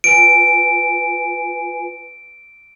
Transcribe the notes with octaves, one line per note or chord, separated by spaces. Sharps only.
F4 B4 G#5 D7